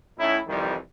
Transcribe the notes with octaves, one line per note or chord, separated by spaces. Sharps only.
A2 C#4 D#4 E4
C2 F2 D#3 E3 G3